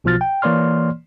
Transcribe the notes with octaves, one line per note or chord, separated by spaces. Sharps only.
B1 B2 F3 F4 F6 A6
G5
E3 A#3 C#5 D5 C6 F6